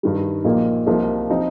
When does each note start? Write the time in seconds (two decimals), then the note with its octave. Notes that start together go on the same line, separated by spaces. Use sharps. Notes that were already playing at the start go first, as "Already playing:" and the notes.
0.03 G2 D#3 G3
0.44 A#1 A#2 A#3 D#4
0.87 C2 C3 F3 A#3 D#4
1.30 F3 C4 D#4